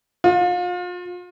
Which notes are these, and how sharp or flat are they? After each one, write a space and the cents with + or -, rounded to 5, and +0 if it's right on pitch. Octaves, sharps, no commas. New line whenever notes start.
F4 +35